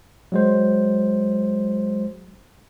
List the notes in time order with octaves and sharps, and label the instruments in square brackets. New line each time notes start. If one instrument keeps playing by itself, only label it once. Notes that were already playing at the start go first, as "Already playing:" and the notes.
[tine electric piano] F#3 G#3 C5